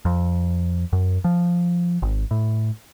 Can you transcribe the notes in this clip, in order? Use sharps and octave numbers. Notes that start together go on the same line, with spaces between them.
F2
F#2
F3
G#1
A2